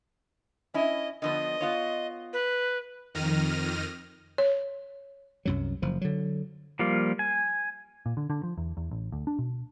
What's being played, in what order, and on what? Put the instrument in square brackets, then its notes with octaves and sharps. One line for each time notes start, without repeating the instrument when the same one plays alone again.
[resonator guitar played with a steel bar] C#4 E4 [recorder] D#5
[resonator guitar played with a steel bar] D3 F3 B3 [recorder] D#5
[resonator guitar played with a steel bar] B3 F4 C#5
[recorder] B4
[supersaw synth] F2 D#3 F6 A#6 D#7
[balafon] C#5
[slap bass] C2 F#2 F#3
F#1 F3
D3 F#3
[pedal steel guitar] F3 G3 A#3 F4
G#5
[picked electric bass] A#2
D3
D3
F3
E2
E2
A1
D2
D4
B2